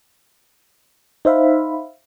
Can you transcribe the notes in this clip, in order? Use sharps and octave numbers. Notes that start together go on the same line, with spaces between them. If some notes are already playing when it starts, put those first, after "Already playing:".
D#4 C5 E5 F5 B5